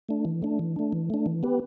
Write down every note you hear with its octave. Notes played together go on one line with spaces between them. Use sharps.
A3 D4
E3
A3 D4
E3
A3 D4
E3
A3 D4
E3
B3 G4 B4